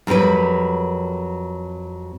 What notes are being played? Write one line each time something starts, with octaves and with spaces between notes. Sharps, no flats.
F2 F#3 G3 A#4 B4